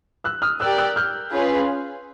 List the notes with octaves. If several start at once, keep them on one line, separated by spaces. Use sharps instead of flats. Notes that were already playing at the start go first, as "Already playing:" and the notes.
E6 F#6
D#6 F6
G4 A#4 D5 G5 E6 F#6
E6 F#6
F6 G6
C#4 F4 G#4 B4